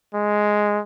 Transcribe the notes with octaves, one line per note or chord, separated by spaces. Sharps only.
G#3